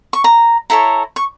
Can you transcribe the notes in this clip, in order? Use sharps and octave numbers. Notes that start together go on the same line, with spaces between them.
C#6
A#5
E4 A4 C#5 A#5
C#6